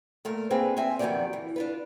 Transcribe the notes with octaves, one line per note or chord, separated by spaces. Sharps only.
A#2 A3 A#4
A#3 C4 D4 F4 G#4 B4
C4 E5 G#5
F2 D#3 F#3 B3 G4 D5
E3
D4 F4 B4